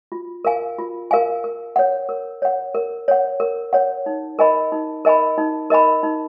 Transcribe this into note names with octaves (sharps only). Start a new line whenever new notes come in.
F4
A#4 F5 G#5
F4
A#4 F5 G#5
A#4
C#5 F#5
A#4
C#5 F#5
A#4
C#5 F#5
A#4
C#5 F#5
D#4
A#4 D#5 G#5 B5
D#4
A#4 D#5 G#5 B5
D#4
A#4 D#5 G#5 B5
D#4